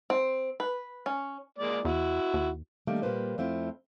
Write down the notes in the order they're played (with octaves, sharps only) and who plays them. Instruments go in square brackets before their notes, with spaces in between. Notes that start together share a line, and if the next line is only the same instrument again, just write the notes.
[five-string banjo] C4
B4
C#4
[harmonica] G#3 A#3 D5
[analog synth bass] E2 [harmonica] E4 F#4
[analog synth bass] D#2
[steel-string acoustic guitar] D#3 G3 A3 A#3 D4
A#2 G3 A#3 B4 C5
F2 A3 C4 E4 F4